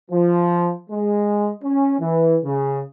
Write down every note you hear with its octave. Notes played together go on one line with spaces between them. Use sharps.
F3
G#3
C#4
E3
C#3